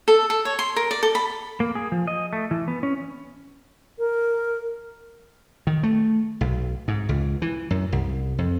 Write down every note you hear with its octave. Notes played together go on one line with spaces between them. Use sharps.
A4
A4
C#5
C6
A#4
D5
A4
B5
A#3
G#4
F3
D#5
A3
E3
B3
C#4
A#4
D#3
A3
B1
G#2
C#2
E3
F#2
C2
F2